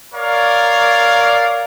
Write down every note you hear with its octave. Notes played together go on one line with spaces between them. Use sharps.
A#4 C#5 D5 F5